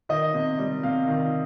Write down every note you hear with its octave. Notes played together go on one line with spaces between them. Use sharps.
D#3 D#5
C3
G3
C3 F5
D#3